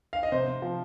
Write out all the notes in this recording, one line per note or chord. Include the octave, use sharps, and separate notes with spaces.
F5
D#5
C3 C5
C3
F3